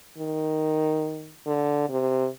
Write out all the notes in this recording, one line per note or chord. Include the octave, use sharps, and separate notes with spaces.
D#3
D3
C3